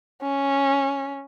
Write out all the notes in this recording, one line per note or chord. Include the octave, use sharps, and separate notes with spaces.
C#4